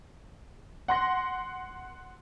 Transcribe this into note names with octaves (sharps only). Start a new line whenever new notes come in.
F#5 C6 A#6